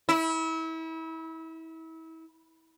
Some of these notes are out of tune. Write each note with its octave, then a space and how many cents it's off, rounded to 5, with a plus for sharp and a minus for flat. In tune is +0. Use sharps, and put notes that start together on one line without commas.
E4 -30